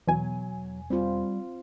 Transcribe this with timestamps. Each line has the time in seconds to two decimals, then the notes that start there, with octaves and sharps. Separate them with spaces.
0.07 E2 B2 F#3 G#5
0.90 G3 C4 F4